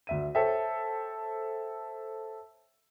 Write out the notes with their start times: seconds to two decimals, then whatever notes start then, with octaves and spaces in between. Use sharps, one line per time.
0.07 D2 E5 D#7
0.35 A4 C5 C#5 E5 G5